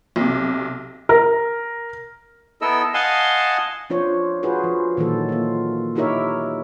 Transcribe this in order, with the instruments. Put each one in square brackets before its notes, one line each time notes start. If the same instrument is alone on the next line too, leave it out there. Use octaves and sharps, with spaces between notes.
[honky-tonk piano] B1 C3
[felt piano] A#4
[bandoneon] B3 E4 A4 A#4 D#5 E6
D#5 F5 F#5 G#5 A5 C6
[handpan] F3 D4 F4 C5 C#5
F4 F#4 G#4 B4 C5
F3
A#2 D#3 E3 F#3 A4
A#3 F4
D#4 E4 G4 A#4 C#5 E5